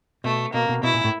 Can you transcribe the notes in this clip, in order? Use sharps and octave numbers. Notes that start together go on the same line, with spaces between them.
B2 A3
B2 A#3
B2
B2 E4
A#2
A2